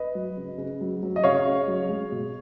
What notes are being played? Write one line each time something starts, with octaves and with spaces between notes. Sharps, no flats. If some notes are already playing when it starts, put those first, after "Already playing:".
Already playing: B4 D#5
F#3
C#3
C#3
F#3
F#3
D#5
C#3 C#5 F5
C#3
F#3
G#3
B2